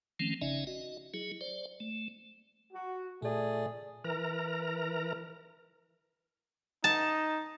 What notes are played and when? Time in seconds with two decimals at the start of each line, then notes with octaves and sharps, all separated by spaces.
0.20 D#3 F3 A3 C4 C#4
0.42 G#1 C#3 C#4 D#4 D5 E5
0.67 F#4 D#5
1.14 F#3 E4 G#4
1.41 C5 D5
1.80 A3
2.73 F#4
3.22 A#2 A3 G#4 D5
4.04 E3 A#4 A#5
6.84 D#4 A5